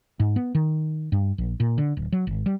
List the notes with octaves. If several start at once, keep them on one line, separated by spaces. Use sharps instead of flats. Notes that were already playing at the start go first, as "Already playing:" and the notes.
G#2
B3
D#3
G2
A#1
A#2
D3
D1
F#3
G#1
G3